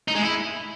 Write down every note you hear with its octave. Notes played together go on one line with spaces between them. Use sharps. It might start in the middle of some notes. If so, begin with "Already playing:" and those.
D#4
G#3
E4